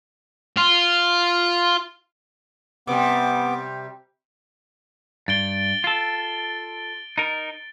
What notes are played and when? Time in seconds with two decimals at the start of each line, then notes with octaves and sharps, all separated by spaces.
0.58 F4
2.87 C3 G3 B3 D6
5.28 G2 A6 D7 G7
5.84 F4 A4
7.18 D#4 A#4